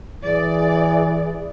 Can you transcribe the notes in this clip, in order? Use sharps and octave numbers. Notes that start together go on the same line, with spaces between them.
E3 G#4 D5